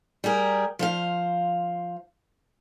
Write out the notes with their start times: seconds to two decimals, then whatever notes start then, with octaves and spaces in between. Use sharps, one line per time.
0.24 G3 G4 G#4 A#4
0.79 F3 C5 F5